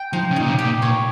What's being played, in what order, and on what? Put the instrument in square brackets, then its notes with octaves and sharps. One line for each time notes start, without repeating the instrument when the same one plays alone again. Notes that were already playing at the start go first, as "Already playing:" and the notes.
Already playing: [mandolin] G5
[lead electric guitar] F3 [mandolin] D#4
[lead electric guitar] C#3
[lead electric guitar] A#2 [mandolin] D#4
[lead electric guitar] C3
[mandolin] G4
[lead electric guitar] A#2
[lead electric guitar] A#2 [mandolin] C#5